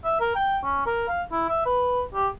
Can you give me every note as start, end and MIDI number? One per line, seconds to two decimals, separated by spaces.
0.04 0.17 76
0.20 0.31 70
0.36 0.58 79
0.63 0.85 61
0.86 1.04 70
1.08 1.22 77
1.32 1.47 64
1.49 1.62 76
1.66 2.03 71
2.14 2.28 67